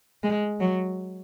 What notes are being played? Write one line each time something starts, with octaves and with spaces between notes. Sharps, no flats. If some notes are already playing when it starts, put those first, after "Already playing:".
G#3
F#3